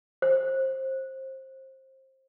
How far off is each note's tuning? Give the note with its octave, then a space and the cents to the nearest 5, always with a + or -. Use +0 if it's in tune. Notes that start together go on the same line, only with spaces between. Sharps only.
C5 +20